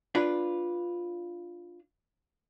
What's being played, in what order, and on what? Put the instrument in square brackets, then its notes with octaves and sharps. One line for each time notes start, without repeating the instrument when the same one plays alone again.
[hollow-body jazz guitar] D4 F4 B4